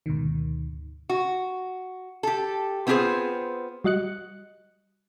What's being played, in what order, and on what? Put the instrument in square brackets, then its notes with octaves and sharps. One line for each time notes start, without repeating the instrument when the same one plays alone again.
[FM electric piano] D2 G#2 B2 D#3
[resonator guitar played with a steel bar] F#4
G4 A4
B3 C4 F4 G4 G#4 C5
[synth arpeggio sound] G3 F#4 D#5 F#6 C#7